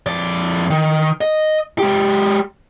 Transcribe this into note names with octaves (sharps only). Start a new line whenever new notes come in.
F2 D5
D#3
D#5
G#3 G4